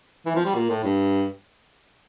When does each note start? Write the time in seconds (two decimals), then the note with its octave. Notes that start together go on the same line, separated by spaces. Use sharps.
0.26 E3
0.36 F3
0.45 G3
0.55 A#2
0.70 A2
0.84 G2